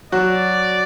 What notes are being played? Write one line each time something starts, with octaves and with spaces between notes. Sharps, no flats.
F#3 F#4 D5